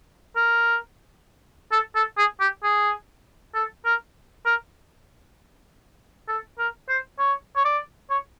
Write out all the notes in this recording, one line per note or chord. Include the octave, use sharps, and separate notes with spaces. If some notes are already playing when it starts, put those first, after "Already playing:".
A#4
A4
A4
G#4
G4
G#4
A4
A#4
A#4
A4
A#4
C5
C#5
C#5
D5
C#5